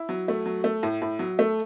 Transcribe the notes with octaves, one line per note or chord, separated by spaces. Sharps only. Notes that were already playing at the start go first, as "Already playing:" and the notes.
Already playing: E4
F#3
A3
F#3
A3
A2
A2
F#3
A3